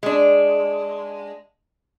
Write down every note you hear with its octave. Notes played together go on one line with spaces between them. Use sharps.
G#3 D4